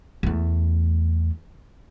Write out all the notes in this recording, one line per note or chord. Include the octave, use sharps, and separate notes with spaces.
E2 A3